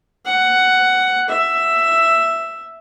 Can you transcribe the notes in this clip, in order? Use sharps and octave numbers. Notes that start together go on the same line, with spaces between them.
F#5
E5